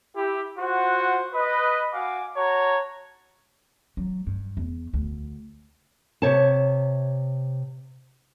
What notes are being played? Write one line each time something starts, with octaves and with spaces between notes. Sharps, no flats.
E4 G4
F4 F#4 C5 F#5
B4 D#5
F#4 F5 G#5 D6
F#4 C#5 A5 A#5
F#3
G2
E2
D2
C3 C#5 A5